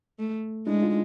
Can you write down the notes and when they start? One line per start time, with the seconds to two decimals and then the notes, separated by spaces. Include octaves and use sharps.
0.19 A3
0.66 G#3 D4 E4
0.82 D#4 F4